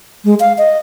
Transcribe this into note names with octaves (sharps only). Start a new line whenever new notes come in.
G#3
F5
D#5